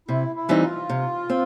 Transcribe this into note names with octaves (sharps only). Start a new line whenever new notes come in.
C3 E4
E4
E3 G3 C4 D#4
F4
C3
C4